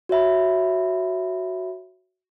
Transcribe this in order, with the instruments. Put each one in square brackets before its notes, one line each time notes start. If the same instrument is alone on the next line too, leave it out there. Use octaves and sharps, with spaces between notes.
[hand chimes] F#4 C#5 E5 B5